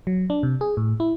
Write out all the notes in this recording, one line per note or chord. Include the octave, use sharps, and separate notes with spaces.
F#3
D4
C3
G#4
A2
E4